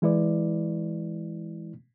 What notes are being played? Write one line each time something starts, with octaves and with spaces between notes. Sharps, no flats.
E3 G#3 E4 B4 D5